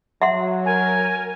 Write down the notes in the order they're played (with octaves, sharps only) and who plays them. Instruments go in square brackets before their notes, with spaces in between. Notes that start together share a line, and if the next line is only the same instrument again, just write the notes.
[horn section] F#3 [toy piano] E5 F#5 C6
[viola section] A#4 [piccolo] G#5